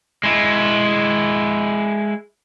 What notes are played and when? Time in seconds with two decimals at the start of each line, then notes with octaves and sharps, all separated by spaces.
0.23 G#3 E4